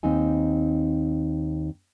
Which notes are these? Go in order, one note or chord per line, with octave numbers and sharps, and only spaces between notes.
D#2 C4 D#4 G#5